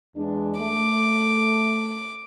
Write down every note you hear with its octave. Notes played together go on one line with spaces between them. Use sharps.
E2 G#3 D4
A3 D6